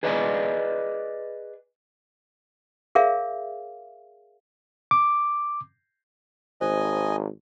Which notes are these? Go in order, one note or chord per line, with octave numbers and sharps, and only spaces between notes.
G#4 B4 D5 D#5 F5 G#5
G#4 A#4 C#5 E5 F5
D6
G#1 C5 D#5 G#5